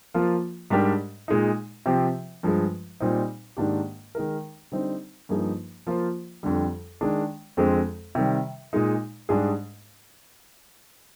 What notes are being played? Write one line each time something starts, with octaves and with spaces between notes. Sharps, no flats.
F3 A#3 F4
G#2 G3 D4 G4 A#4
A#2 G#3 D#4
C3 F3 C4 G4
G2 F3 G#3
A#2 G3 C4 D#4
G#2 D#3 A#3 D4 G4
D#3 G#3 D#4 A#4
D3 G3 C4 D#4
G2 F3 A#3 D#4 G#4
F3 A#3 F4 C5
F2 D3 G3
D#3 G#3 D4
F2 D3 G#3 C4
C3 D#3 G3
A#2 G#3 D#4
G#2 G3 D4 G#4